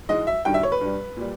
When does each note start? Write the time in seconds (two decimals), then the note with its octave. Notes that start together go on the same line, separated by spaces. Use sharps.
0.09 G#2 E3 G#3 D#5
0.27 E5
0.45 G2 D#3 G3 G5
0.54 E5
0.63 C#5
0.72 B4
0.81 G2 G3
1.17 A#2 G3